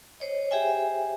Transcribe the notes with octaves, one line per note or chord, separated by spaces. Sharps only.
C5 C#5 D#5
G4 G#4 C5 E5 G5 G#5